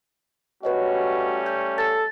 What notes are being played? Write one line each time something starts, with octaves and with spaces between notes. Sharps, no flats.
G3 A3 C#4 F#4 B4 C#5 D#5
G6
A4 A6